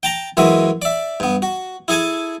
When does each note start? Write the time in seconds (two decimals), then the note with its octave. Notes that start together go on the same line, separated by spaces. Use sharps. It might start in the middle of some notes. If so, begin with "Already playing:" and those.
0.03 G5 A5 A#5
0.37 F#2 E3 G#3 F#4 E5
0.82 D5 E5
1.20 G2 B3
1.42 F#4
1.88 E4 G#4 A4 G#5 A5